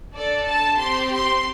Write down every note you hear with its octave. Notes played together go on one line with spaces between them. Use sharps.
D4 A4 D5
A5
C4 G4 C6
C6